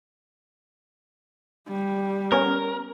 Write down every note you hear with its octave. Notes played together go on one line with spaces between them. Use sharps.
G3
B3 C#4 A#4